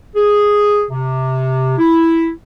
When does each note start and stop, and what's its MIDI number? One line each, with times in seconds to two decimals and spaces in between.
0.15 0.84 68
0.90 1.73 48
1.78 2.30 64